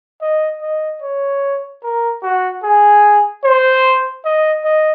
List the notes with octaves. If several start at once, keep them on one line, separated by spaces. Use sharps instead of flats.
D#5
D#5
C#5
A#4
F#4
G#4
C5
D#5
D#5